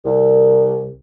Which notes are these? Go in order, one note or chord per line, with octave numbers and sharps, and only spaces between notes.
C2